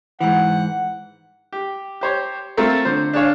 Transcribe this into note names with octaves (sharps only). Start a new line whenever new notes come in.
G#2 E3 F#5
G4
G4 C5 C#5
A3 C4 F4 A4 A#4
D3 C5
D4 G#4 C#5 F5